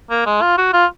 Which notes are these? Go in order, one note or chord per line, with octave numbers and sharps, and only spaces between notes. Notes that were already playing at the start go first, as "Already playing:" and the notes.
A#3
G#3
F4
F#4
F4